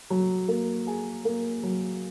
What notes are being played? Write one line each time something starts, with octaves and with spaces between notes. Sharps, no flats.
F#3
A#3
G#4
A#3
F#3